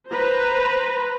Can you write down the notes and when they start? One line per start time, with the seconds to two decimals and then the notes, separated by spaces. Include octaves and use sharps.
0.12 B4 C5 A#5